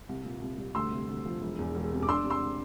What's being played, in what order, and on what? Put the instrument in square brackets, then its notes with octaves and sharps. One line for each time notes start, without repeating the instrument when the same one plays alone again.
[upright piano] C2
A#2
C2
G3
D2 C6 E6
C3
D2
F3
E1
E2
E1
C3
D6
D4 C6 E6
C3
C6 E6